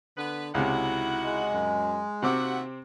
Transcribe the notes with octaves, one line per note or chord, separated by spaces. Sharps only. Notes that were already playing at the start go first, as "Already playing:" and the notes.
D3 B3 B4
C#2 C3 D#4 E4 F#4 F#5
G#3
F#2
D#2 C3 C4 F#4 E5 F#5 D6